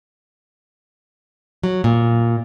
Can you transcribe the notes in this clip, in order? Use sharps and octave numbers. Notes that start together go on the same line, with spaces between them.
F#3
A#2